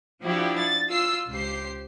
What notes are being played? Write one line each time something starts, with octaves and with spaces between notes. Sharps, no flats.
F3 D4 E4 F#4 G4
A6
F4 E6 C7
C#2 G4 C5 C7